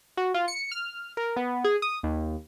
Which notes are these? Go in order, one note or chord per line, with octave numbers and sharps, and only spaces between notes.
F#4
F4
C#7
F6
A#4
B3
G#4
D#6
D#2